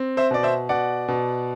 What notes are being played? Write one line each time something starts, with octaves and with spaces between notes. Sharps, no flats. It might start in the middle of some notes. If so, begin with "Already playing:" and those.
Already playing: C4
C5 E5
B2 D5
C5 E5
B2 D5 F#5
B2